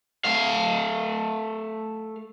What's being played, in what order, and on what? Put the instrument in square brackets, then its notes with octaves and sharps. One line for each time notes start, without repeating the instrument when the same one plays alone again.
[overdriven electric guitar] A3 F5